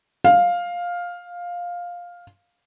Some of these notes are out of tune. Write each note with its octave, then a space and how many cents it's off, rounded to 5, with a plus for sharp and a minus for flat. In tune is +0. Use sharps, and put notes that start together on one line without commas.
F5 +10